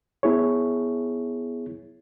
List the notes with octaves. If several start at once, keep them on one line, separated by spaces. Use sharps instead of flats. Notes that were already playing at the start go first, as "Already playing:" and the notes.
B3 E4 G#4 C#5